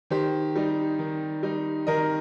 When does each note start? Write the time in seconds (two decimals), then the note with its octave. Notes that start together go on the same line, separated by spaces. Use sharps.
0.10 D#3 G4 C5
0.56 G3 D#4
0.99 D#3
1.43 G3 D#4
1.87 D#3 A#4 D#5